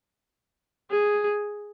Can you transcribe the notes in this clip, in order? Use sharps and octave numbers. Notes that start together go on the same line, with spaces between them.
G#4